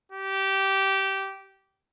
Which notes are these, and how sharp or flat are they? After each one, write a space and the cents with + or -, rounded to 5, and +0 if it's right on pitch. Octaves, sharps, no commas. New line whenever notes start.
G4 -15